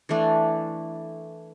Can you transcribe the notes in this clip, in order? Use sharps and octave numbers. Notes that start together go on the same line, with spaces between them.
E3 A3 D4